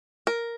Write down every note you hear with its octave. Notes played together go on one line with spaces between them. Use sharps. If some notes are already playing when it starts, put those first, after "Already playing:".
A#4